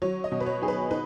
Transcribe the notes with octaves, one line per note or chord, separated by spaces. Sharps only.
F#3 C#5
D#5
B2
B4
C#5
D#4 G#4
B4
D#4 B4